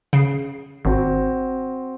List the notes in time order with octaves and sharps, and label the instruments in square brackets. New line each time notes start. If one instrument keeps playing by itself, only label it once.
[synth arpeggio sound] C#3 C7
[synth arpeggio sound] G#1 [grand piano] C4 F#4